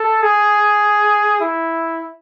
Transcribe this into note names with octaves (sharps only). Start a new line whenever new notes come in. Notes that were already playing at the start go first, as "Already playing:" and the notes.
Already playing: A4
G#4
E4